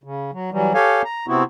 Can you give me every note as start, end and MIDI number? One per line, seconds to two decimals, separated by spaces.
0.04 0.31 49
0.33 0.50 54
0.52 0.73 52
0.52 0.73 54
0.52 0.73 55
0.74 1.02 67
0.74 1.02 69
0.74 1.02 73
0.74 1.02 77
0.74 1.02 80
1.05 1.26 82
1.28 1.43 48
1.28 1.43 59
1.28 1.43 60
1.28 1.43 64
1.28 1.43 66